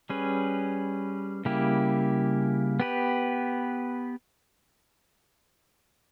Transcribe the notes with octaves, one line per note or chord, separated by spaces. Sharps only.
G3 C#4 G#4 B4
C#3 G3 A#3 E4 G4
B3 G4 B4